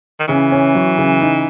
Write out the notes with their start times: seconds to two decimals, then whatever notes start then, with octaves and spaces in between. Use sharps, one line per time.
0.20 D#3
0.28 C#3 E3
0.52 C#4
0.75 F#3
0.98 C#3
1.21 D#4